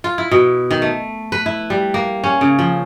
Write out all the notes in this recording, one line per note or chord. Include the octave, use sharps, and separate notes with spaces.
F4
E4
B2
D#3
A3
B4
E4
G3
A#3
C#4
C#3
F3